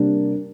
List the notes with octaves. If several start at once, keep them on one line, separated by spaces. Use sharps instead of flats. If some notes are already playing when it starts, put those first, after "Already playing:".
Already playing: C3 G3 A#3 D4